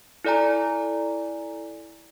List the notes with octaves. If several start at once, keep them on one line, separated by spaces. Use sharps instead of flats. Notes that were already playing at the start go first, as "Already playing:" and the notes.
E4 A4 D5 G#5 A#5